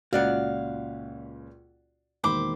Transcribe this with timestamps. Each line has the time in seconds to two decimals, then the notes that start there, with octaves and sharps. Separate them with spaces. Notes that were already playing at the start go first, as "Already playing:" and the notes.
0.13 C#2 A#2 C#4 F#4 D5 F5 F#5
2.24 E1 D#3 A#3 C5 B5 D6